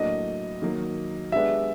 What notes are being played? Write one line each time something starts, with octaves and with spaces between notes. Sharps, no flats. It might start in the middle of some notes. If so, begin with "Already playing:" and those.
Already playing: A2 F#3 A#3 D4 D#5
D#3 F#3 A#3
G#3 B3 D4 G4 E5